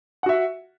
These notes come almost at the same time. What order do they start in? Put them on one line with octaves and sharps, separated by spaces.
F#5 F#4 E5